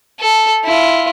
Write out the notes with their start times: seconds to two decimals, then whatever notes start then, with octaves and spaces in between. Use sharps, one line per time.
0.20 A4
0.64 E4 F4